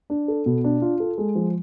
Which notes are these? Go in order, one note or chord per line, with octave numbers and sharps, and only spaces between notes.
D4
A4
B2
D4
F4
A4
G#3
F3